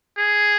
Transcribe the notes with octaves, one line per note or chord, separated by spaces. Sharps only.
G#4